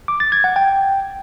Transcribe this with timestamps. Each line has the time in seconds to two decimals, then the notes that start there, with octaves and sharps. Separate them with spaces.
0.08 D6
0.20 A6
0.32 G#6
0.44 F#5
0.56 G5